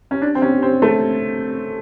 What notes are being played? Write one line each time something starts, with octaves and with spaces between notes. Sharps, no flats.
C#4
D4
C4
C#4
C4
A3